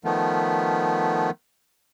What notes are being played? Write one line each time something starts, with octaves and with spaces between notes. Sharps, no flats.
D#3 F3 A3 B3